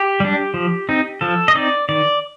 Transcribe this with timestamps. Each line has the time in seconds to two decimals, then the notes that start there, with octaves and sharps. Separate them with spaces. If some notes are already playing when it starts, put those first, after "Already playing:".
Already playing: G4
0.20 G3 D4
0.54 F3
0.89 C4 D#4
1.21 F3 A4
1.48 D#5
1.55 C4 D#4 D5
1.89 D#3 D5